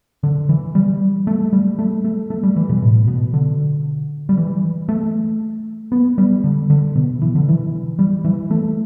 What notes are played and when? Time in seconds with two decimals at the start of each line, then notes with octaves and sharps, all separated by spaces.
0.23 D3
0.49 E3
0.75 G3
1.27 A3
1.53 G3
1.79 A3
2.04 A3
2.30 A3
2.43 G3
2.56 E3
2.69 B2
2.82 A2
3.07 B2
3.34 D3
4.29 G3
4.37 E3
4.89 A3
5.92 B3
6.18 G3
6.44 D3
6.70 D3
6.95 B2
7.22 E3
7.35 D3
7.49 E3
7.99 G3
8.24 E3
8.51 A3